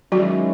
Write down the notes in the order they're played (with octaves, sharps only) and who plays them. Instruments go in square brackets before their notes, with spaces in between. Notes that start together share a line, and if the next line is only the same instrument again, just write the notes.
[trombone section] D#3 G#3 C#4 E4 [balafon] F#3 F#4